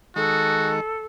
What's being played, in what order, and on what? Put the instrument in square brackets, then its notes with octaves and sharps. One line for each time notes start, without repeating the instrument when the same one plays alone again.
[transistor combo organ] D#3 G#3 [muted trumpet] F#4 [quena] A4